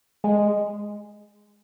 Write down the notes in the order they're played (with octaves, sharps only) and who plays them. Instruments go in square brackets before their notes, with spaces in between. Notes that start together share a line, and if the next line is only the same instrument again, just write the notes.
[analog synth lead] G#3